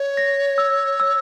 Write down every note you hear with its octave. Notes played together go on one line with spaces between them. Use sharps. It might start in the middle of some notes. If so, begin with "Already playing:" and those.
Already playing: C#5
A#6
E6
E6